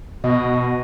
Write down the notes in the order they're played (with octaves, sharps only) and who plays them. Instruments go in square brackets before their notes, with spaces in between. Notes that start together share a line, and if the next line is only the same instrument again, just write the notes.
[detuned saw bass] B2 [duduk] F#4 [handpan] D#5